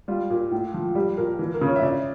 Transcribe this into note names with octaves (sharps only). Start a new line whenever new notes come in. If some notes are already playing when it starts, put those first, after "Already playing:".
G3 F4
A#2
A2
F3
G3 G4
A#2 A#4
E3
A#4
C#3
C#5
E5
C#3 D5